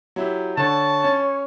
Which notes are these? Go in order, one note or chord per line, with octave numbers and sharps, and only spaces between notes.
F#3 E4 G4
D3 C#5 A5
C#4